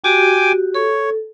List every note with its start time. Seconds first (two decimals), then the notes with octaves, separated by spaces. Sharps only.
0.04 F#4 G4 G5 G#5 D6
0.75 A4 C#5